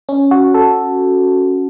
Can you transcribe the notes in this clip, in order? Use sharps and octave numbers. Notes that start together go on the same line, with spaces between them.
C#4
F#4
A4